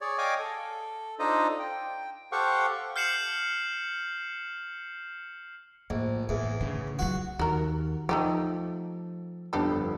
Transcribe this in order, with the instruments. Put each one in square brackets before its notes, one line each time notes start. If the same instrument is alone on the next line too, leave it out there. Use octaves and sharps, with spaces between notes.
[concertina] G#4 C#5 D5
C#5 D#5 F5 G5 G#5 D6
A4
D4 D#4 F4 A4 C5 D#5
G5
G4 A4 C5 F5 F#5 C#6
[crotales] F6 G6 C7 C#7 E7 F#7
[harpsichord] A#1 [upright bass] A2
[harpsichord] E2 [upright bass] A2
[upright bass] C#3
[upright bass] F#3 F4 [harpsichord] F#4
[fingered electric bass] D#2 [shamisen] F#4 A#4
[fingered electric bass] F3 [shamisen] A3 D#4 G4 [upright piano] A4
[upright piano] G1 F2 B3 [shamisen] D4 G4 A4